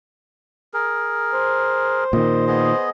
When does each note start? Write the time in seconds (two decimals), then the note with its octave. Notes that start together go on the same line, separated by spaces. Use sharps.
0.74 G#4 A#4
1.33 C5
2.13 A#2 D#3 D#5
2.47 B3 G#4 D#5